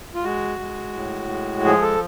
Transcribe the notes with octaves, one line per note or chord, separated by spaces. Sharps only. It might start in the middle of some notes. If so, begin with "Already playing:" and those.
F4
G#3 F#4
G#3
A2
G#3
F3 G#4
A4